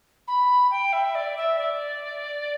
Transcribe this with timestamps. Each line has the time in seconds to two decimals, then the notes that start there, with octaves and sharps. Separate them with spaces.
0.27 B5
0.70 G5
0.92 E5
1.15 D5
1.36 E5
1.58 D5